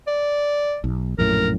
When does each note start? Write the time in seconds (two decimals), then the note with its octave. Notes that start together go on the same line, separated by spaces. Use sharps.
0.07 D5
0.84 B1
1.18 A#1 F#2 A2 A#4